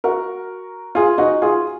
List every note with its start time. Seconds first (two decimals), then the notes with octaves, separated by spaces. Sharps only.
0.04 F#4 A#4
0.95 F4 G#4
1.18 D#4 F#4
1.42 F4 G#4